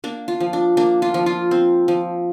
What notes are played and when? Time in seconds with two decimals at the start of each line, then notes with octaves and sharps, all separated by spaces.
0.04 A#3 D4
0.28 F4
0.40 F3
0.53 D4
0.77 A#3 D4
1.02 F4
1.14 F3
1.26 F4
1.51 C4
1.88 F3